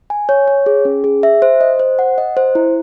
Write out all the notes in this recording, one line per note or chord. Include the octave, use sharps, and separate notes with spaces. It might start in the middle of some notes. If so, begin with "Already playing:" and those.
G#5
C#5
C#5
G#4
C#4
G#4
E5
C5
D#5
C5
F#5
D#5
C5
E4